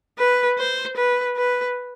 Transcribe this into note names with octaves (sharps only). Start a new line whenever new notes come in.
B4
C5
B4
B4